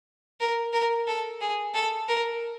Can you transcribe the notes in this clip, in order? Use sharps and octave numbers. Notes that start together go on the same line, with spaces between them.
A#4
A#4
A4
G#4
A4
A#4